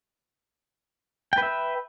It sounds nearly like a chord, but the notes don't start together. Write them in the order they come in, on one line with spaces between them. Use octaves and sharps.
G5 B4 E5